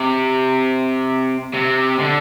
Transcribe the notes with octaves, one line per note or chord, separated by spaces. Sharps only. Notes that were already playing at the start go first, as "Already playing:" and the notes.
Already playing: C3
C3
D3